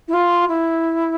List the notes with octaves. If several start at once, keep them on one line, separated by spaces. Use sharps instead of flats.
E4
F4
E4